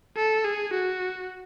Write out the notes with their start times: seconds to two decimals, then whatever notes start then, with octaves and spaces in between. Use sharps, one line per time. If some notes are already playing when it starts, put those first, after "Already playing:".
0.17 A4
0.45 G#4
0.74 F#4